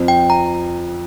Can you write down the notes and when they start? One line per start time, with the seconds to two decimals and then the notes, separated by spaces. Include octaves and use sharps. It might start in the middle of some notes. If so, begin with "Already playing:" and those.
Already playing: F2 F3 C4
0.08 G5
0.30 A#5